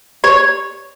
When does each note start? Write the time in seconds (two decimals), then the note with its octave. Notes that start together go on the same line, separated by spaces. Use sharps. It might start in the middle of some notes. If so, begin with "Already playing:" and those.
0.24 C#5